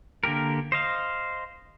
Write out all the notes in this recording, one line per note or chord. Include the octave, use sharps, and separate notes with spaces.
D3 A#3 G4 A#4
C5 D#5 F5